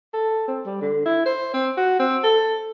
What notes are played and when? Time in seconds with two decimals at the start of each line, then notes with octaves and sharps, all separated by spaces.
0.14 A4
0.48 C4
0.66 G3
0.82 D3
1.06 E4
1.26 C5
1.54 C4
1.77 F#4
1.99 C4
2.24 A4